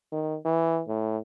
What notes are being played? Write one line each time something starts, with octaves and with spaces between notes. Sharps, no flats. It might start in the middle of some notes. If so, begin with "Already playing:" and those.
D#3
E3
A2